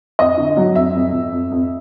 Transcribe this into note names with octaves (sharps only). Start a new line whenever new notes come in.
F2 D#5
D3
F#3
F2 E5
F2
F2
F2
F2